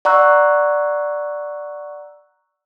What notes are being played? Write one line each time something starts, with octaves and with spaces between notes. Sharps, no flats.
D5 F#5 A#5 C#6 E6 F#6